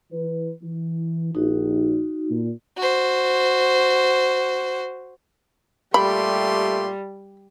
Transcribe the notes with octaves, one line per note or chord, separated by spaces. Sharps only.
E3 B4
E3
A#1 D#4 F#4
A#2
F#4 C5
A#2 G3 A3 G4 B5 C6